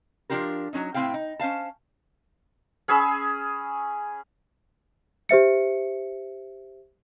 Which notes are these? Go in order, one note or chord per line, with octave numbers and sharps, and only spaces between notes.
F3 D4 F4 G4 A#4
F#3 G#3 C#4 D#4
A2 A3 C4 E4 F5 G5
D#4
C#4 C5 F5 A5
C#4 G#4 B5 E6
G4 C5 E5 C#7